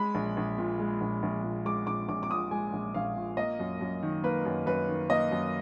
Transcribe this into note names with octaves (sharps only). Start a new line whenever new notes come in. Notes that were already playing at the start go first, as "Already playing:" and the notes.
Already playing: G#3 B5
A#1
A#1
A#2
G#3
A#1
A#1
A#2
G#3 D6
A#1 D6
A#1 D6
D6
A#2 D#6
G#3 G#5
A#1
A#1 F5
A#2
A#3 D#5
F#2
F#2
D#3
A#3 B4
F#2
F#2 B4
D#3
A#3 D#5
F#2